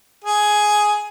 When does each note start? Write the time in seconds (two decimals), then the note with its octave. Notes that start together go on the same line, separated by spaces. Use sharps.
0.24 G#4